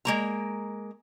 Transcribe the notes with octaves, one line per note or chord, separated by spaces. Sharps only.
G#3 A#3 A#5